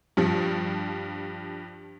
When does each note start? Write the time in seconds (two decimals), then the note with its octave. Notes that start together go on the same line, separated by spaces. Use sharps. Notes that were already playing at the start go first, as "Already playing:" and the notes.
0.17 G2 F3